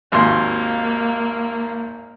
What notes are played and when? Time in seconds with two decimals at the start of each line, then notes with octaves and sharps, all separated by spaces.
0.12 G#1 D#2 A#3 C6